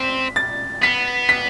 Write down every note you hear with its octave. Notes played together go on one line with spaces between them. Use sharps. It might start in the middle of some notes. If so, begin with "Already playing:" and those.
Already playing: C4 B6
A6
B3 B6
B6